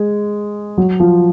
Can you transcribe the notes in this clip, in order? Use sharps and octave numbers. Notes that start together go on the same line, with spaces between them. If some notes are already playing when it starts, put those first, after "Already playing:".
Already playing: G#3
F#3
F3